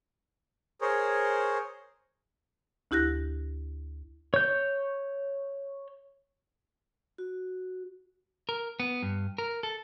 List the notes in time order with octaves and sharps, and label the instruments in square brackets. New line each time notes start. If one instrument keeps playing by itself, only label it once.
[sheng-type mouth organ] G#4 A#4 C5 C#5
[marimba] D2 E4 G4 F#6 A#6
[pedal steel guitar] C#5 G6
[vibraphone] F#4
[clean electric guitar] A#4
B3
G2
A#4
A4